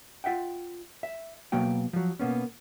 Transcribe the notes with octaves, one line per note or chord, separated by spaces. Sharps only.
F4 E5 F#5 G5
E5
B2 F#3 A#3 F#4 G5
F3 F#3
B2 A#3 B3 C#4